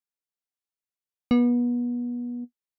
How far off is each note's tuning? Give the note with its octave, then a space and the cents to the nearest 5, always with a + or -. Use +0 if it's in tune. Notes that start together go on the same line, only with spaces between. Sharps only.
B3 -30